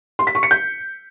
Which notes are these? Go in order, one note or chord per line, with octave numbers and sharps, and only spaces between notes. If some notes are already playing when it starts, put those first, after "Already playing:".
C6
B6
C#6
C#7
G6